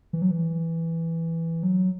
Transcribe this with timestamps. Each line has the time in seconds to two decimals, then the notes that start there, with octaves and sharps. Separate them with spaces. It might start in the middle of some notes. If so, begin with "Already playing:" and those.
0.13 E3
0.22 F#3
0.31 E3
1.63 F#3